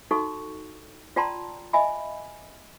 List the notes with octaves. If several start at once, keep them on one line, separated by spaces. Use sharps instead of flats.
D#4 F#4 A4 C#6
F4 D5 G5 A5 A#5 C6
D#5 E5 G#5 B5